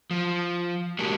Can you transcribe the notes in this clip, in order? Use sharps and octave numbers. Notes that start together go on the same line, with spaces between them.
F3
G#3 A#3 D4 F#4 G4 A#4